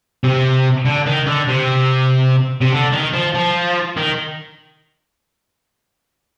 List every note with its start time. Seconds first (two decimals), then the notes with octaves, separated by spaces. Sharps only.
0.24 C3
0.85 D3
1.06 D#3
1.27 D3
1.48 C3
2.61 C3
2.72 D3
2.93 D#3
3.13 F3
3.34 F3
3.97 D#3